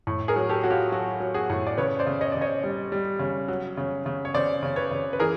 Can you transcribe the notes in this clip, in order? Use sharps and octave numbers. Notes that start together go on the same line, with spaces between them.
A2
G#4 A#4
F#3
G4 A4
F#3 F#4
F4 G4
F#3 F#4
F#3
F#4 G#4
A2
D5
C#3 B4 C#5
C5 D5
C#3
C#5 D#5
C#3 D5
C#5 D#5
G3
G3
C#3
F#3
C#3
C#3
C#5
C#3 C5 D5
C#3
B4 C#5
C#3
B4
E3 G#4 A#4